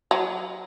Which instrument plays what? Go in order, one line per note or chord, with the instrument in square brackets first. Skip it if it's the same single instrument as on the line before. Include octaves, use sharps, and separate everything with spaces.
[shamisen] F#3